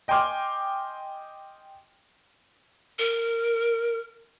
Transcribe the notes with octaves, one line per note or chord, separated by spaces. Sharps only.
D#5 G5 G#5 C6 D6 F6
A#4